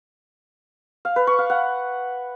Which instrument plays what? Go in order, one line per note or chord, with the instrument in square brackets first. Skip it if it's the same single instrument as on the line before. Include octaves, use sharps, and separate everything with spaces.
[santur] F5
B4
C#6
F5
F#5